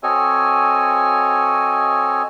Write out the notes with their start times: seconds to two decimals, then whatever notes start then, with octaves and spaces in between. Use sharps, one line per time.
0.03 C4 F#4 A4 C#5 D#5 G#5